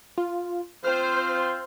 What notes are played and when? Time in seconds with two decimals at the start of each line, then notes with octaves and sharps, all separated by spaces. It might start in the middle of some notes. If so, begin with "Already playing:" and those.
0.18 F4
0.84 C4 F4 C5 F6